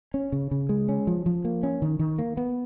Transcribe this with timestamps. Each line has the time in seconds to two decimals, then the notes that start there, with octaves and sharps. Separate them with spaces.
0.14 C#4
0.32 C#3
0.51 C#3
0.69 G#3
0.89 C#4
1.07 F3
1.26 F3
1.45 A#3
1.63 C#4
1.82 D#3
1.99 D#3
2.19 A#3
2.37 B3